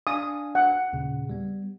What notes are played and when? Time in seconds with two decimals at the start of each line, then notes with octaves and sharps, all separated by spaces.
0.07 D4 F5 G#5 D#6
0.55 F#5
0.93 D#2 A#2 C#3
1.29 G3 B3